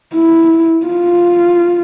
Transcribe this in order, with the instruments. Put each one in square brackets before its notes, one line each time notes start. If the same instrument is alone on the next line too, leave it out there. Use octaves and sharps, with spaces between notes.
[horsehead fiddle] E4
F4